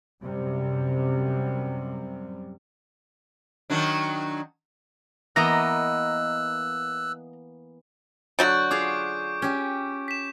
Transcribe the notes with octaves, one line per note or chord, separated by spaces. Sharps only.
F#2 C3 G3
D#3 F#3 D4
E3 A#3 B3 D#5 A#5 E6 F#6
D3 F#3 F#4 C#6 G6 D7
F4 G#4 F5 D6
C#4 G4
B6 E7